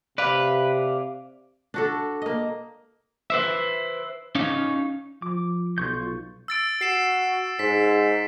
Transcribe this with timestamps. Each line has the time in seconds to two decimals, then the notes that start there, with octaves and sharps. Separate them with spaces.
0.18 C3 B4 D5 F5
1.74 D4 F#4 A4
2.22 A#3 D#5
3.30 B4 C5 E5
4.35 C#4 D#4 C#5 F5
5.22 F3 D6
5.78 B1 F4 C#6 G6
6.48 E6 A6 D7
6.81 F#4 C7 E7
7.59 G#2 B6